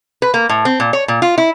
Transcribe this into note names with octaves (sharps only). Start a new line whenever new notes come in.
B4
A#3
A2
C4
A#2
C#5
A#2
F4
E4